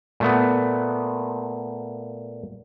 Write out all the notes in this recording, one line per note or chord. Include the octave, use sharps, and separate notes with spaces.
A#2 A3 B3